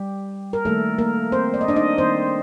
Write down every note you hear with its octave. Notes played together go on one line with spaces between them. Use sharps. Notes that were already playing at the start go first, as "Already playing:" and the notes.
Already playing: G3 G4
A#4
D#3 G3 A3 A#3 A4
A#3 A#4
C4 C5
D5
D#5
D4 D5
D#4 D#5
D#3 G3 A#3 C4 C5